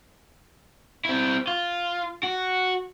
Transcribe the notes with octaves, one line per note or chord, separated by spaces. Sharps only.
C4 E4
F4
F#4